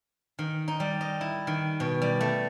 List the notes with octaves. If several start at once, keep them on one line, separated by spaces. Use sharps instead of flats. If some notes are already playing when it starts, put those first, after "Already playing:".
D#3
D#4
G3
D#5
E4
D#3
B2
G3
A3